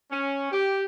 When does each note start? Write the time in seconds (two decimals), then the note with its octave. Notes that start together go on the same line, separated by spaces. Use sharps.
0.11 C#4
0.52 G4